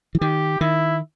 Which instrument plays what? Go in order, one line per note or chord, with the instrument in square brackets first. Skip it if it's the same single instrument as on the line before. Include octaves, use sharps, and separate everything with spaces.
[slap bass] E3
[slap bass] D#3 [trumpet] G4
[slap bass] D#3 [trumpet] E4